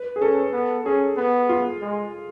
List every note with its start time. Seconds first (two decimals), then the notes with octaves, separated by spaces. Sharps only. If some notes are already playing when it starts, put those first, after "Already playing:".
Already playing: B4
0.16 G#4
0.21 C#4 A4
0.53 B3
0.86 C#4 G#4
1.17 B3
1.49 F4
1.81 G#3